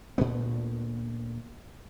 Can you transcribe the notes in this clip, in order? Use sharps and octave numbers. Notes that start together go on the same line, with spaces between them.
D2 A#2 A#3 B3